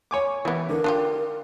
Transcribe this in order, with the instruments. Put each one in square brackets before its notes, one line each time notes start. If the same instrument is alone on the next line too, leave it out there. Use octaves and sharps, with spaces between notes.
[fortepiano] C#5 G#5 D6
[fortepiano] E3 [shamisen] G3 B3
[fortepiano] D3 [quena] A#4
[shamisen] D4 F4 G4